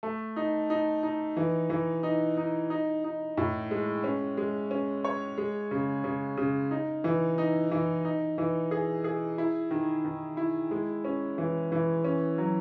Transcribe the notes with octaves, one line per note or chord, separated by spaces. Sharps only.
A3
D#4
D#4
D#4
E3
E3
D#4
D#4
D#4
D#4
A2
G#3
C#4
G#3
C#4
C#5
G#3
C#3
C#3
C#3
D#4
E3
D#4
E3
D#4
E3
G#4
G#4
E4
D#3
D#3
E4
G#3
C#4
E3
E3
C#4
F#3